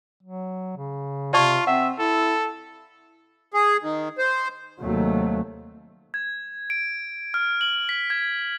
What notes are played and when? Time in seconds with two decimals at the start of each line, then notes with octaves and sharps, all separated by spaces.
0.23 F#3
0.77 C#3
1.33 C3 F4 D5 A5 C#6
1.67 C4 E5 F#5
1.99 E4 A4
3.54 G#4
3.82 D#3
4.18 C5
4.80 D#2 C3 F#3 A3
6.14 G#6
6.70 D7
7.34 F6
7.61 F#7
7.89 B6
8.10 G#6